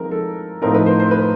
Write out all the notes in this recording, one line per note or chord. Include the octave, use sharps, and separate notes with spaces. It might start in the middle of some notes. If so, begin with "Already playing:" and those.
Already playing: F3 G#3 C4 D#4 A#4
A4
A2 F3 A3 C4 D#4 A#4
B4
C5
C5
B4